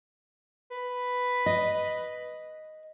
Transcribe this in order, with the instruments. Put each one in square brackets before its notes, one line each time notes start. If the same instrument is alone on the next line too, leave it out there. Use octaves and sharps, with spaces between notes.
[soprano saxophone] B4
[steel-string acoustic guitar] D#5